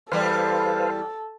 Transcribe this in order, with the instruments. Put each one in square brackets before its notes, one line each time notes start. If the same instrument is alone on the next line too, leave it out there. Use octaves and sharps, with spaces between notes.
[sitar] E2 G3 [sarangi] A4 [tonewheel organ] B4 C5 F5